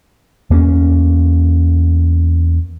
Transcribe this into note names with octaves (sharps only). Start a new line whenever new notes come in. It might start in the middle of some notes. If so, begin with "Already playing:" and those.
E2 A#3 B3 C#4